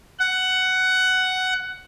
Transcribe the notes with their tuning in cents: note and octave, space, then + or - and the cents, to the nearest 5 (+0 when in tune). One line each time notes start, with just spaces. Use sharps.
F#5 +10